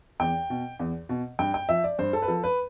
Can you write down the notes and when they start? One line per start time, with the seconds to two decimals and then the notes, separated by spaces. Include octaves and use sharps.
0.20 E2 G5
0.50 B2
0.79 E2
1.09 B2
1.39 G2 G5
1.54 G5
1.69 F3 E5
1.84 D5
1.99 G2 C5
2.13 A4
2.22 B4
2.28 F3 A4
2.43 B4